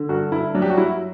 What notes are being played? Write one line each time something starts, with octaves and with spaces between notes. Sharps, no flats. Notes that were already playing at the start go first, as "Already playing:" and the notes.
Already playing: D3
G2 F#4
G2 E4
F#3 D4
G4
F#4
F#3 E4